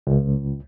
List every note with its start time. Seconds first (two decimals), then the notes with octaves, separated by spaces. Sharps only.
0.07 C#2